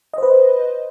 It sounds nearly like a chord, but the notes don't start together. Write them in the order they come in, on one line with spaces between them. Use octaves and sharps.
D#5 C5 B4